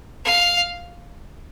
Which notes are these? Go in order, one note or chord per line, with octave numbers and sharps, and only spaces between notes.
F5